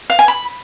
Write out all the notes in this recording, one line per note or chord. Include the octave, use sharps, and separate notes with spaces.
F5
G#5
B5